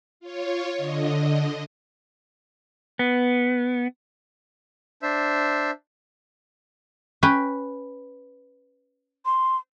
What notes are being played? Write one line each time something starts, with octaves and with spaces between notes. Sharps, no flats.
F4 C#5
D3 D#5
B3
D4 C5 E5
C#4 B4 G5
C6